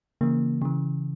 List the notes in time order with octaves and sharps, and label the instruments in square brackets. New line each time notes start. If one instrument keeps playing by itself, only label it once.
[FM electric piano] C#3 E3 A#3
C#3 E3